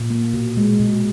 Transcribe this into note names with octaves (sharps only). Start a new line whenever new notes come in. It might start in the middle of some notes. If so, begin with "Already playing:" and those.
Already playing: A#2
A#3
B2
G#3
B2